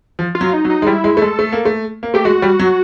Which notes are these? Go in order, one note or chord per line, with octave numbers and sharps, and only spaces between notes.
F3
F4
F#3
D#4
F#3
D#4
G#3
G3 E4
G#3
A3
G#3 A4
A3
A#3
A3
A#3
A3 G4
G#3 F#4
G3
F#3